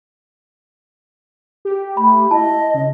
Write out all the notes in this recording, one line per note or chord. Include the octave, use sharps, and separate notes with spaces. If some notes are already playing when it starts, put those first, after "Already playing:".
G4
A3 B5
E4 D#5 A5
C#3